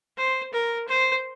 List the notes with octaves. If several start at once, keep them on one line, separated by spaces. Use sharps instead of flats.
C5
A#4
C5